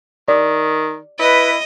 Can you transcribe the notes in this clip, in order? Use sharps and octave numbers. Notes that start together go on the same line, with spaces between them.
D#3 D5
E4 B4 D#5